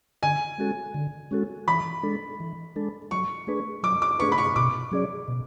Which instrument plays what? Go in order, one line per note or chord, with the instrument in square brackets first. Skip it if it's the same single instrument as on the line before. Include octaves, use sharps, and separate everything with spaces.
[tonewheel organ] D3 [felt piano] G#5
[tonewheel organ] G#3 C#4 F#4 A4
D3
G#3 C#4 F#4 A4
[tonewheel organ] E3 [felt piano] B5
[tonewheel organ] G#3 D4 A4
E3
G#3 D4 A4
[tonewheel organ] F#3 [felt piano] C#6
[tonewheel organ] A3 D4 G#4 B4
[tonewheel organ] F#3 [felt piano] D6
[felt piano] D6
[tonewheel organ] A3 D4 G#4 B4 [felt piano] C#6
[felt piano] B5
C#6
[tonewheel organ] B2 [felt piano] D6
[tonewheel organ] F#3 C#4 G#4 D5
B2